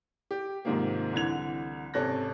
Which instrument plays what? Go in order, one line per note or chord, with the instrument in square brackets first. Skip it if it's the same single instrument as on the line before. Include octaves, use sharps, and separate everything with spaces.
[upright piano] G4
G#2 C3 D#3 F3 A#3
C2 D3 E3 G#6 F7
G#1 C3 C#4 A4 F#6 A#6